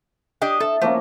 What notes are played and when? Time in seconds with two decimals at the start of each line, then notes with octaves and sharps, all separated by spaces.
0.41 D4 G4 D#5
0.60 A4 E5
0.81 F3 A3 A#3 C#4